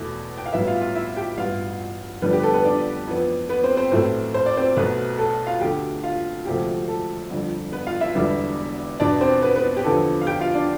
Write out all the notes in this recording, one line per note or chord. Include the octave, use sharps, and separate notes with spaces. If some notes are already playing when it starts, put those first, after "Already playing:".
Already playing: E2 B2 A3
G5
F5
B1 A2 G3 B3 E4 E5
F4 F5
F4 F5
E4 E5
G4 G5
A1 G2 E3 B3 F4 F5
F1 F2 D3 G3 B3 B4
G4
B4
A4
B3 B4
D4 D5
F2 E3 B3
B3 B4
C4 C5
C4 C5
B1 A2 E3 A3 C4 C5
C5
D5
C4 C5
B1 B2 A3 B3 B4
A4
F4 F5
D2 D3 A3 G4 G5
F4 F5
E1 D2 C3 F3 A3 G4
A4
G1 F2 D3
B3 B4
F4 F5
E4 E5
E1 E2 D3 G3 B3
E2 B2 B3 D4 D5
C4 C5
B3 B4
B3 B4
G4
E2 D3 F3 B3 A4
F5
G4 G5
F4 F5
D4 D5